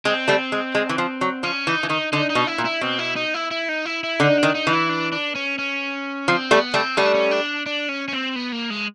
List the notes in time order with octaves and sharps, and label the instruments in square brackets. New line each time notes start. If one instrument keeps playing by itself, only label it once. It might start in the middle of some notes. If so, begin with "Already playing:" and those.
[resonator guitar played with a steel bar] G#3 [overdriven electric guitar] C4
[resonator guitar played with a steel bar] G3 A3
G#3
G#3
E3
F3
F#3
[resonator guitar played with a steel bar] F3 [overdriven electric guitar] C#4
[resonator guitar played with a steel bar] E3 [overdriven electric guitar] D#4
[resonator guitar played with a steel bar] E3
[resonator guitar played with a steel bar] D#3 [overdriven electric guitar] D#4
[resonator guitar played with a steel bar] D3 [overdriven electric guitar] D#4
[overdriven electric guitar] D#4
[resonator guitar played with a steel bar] B2
[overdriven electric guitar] E4
[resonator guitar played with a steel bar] A#2
[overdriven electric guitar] E4
[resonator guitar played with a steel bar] B2 [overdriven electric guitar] C4
[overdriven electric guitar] E4
D#4
E4
E4
D#4
E4
E4
[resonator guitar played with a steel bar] D3 [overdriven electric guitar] D#4
[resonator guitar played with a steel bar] D#3 [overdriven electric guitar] D4
[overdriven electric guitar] D#4
[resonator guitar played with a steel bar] E3
[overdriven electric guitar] E4
D4
D4
C#4
C#4
[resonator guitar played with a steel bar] F3 [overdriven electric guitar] C4
[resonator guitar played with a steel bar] G3 A3 [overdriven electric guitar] B3
[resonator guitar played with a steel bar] G3 A3 [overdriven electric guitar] C4
[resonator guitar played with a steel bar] G3 A3 [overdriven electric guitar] C#4
[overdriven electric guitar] D4
C#4
D4
D4
C#4
C#4
C4
B3
A#3
G#3